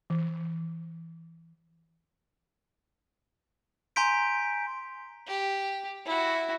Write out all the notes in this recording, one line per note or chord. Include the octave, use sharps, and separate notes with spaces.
E3
G#5 A#5 C6 G6 B6 D7
G4
E4 F#4